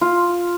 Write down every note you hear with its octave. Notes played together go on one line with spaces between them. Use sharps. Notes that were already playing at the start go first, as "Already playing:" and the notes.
F4